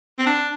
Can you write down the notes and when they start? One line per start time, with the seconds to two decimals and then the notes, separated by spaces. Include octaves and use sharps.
0.19 C4
0.26 D4